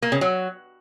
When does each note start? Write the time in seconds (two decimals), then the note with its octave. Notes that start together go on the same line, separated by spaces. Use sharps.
0.02 A#3
0.12 C#3
0.21 F#3